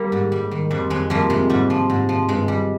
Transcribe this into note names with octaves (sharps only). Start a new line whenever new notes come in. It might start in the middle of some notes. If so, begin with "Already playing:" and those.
Already playing: G3 A#3
G#2
G3
D#3
F2 G3
F2 G#3
F3 G3 A#3
C3 G#3
G#2 G3
F3
G#2
F3
G2 G#3
G3